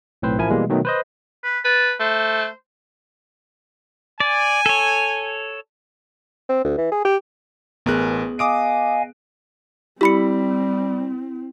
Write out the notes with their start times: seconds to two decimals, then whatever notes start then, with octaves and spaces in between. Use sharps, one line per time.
0.22 B1 A2 C4 B4 C5
0.38 A1 F3 E4 A#4 G#5
0.50 B2 E3 G3 G#3 A#3
0.69 B2 D#3 F#3 A3
0.85 B4 C5 D#5
1.44 B4
1.64 B4 A5
2.00 A3 C5
4.20 D5 G#5
4.66 A4 C#5
6.49 C4
6.65 D2
6.78 E3
6.92 G#4
7.05 G4
7.86 A1 B3 G#4 A#4 F#6
8.39 D#5 F5 G#5 D6 D#6 D7
10.01 G3 C4 E4 G4 B5 C#7